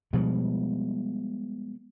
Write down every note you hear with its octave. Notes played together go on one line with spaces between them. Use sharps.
B2 F3 G3 G#3